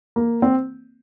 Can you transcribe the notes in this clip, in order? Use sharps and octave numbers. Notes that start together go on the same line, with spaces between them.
A#3
C4